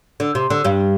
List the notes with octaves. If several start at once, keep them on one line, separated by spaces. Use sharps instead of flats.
D3
C3
D3
G2 G3